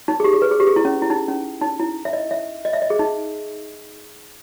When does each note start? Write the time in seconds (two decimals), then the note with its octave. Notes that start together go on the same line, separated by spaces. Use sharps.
0.08 D#4
0.20 G#4
0.24 G4
0.33 G#4
0.42 B4
0.51 G#4
0.60 G4
0.67 G#4
0.76 E4
0.85 C#4
1.02 E4
1.10 D#4
1.28 C#4
1.61 D#4
1.79 E4
2.05 E5
2.13 D#5
2.31 E5
2.65 D#5
2.73 E5
2.82 D#5
2.90 G#4
2.99 D#4